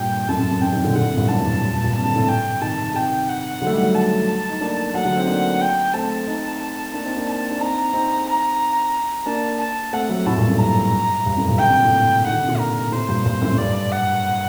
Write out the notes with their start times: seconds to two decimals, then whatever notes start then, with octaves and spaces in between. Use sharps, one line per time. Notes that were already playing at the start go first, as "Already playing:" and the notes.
Already playing: G2 A#2 G5
0.28 F#2 A2 A5
0.39 F#2
0.51 F#2
0.61 F#2 G5
0.73 C3 D#3
0.84 A#2 D3
0.95 A#2 D3 F#5
1.06 A2 C3
1.17 G2 A#2
1.28 F#2 A2 A5
1.45 G2
1.62 G2
1.73 G2 A#2
1.84 G2 A#2
1.94 C3 A5
2.05 D3
2.15 A2 C3
2.28 G5
2.61 C3 D#3 A5
2.94 C3 D#3 G5
3.29 F#5
3.61 D3 F#3
3.67 A3
3.72 D#3 G3
3.83 F#3 A3
3.94 A5
4.50 D#4
4.61 A#3 D4
4.94 F#3 A3 F#5
5.05 D3 F#3
5.16 C4 D#4
5.27 A#3 D4
5.61 G5
5.93 A3 C4 A5
6.27 C4 D#4
6.93 A#3 D4
7.05 C4 D#4
7.16 A#3 D4
7.28 A5
7.51 D4
7.60 C4 D#4 A#5
7.93 C4 D#4
8.27 A#5
9.26 A#3 D4 A5
9.60 A5
9.93 A3 C4 F#5
10.09 F#3 A3
10.26 A2 C3 A5
10.37 G2 A#2
10.48 F#2 A2
10.59 G2 A#5
11.26 G2
11.37 F#2 A2
11.48 G2 A#2
11.59 D3 G5
11.68 C3
11.76 A#2
11.85 A2 C3
12.26 D#3 F#5
12.33 D3
12.41 C3
12.48 A#2 D3
12.59 A#4
12.92 A2 C3 C5
13.09 G2 A#2
13.25 G2 A#2
13.42 F#2 A2
13.52 F#2
13.58 G2 D5
13.91 F#5